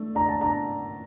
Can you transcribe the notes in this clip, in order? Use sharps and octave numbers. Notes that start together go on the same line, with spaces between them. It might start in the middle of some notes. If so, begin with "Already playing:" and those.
Already playing: A3 D4
D4 A#5
A5
D4 A#5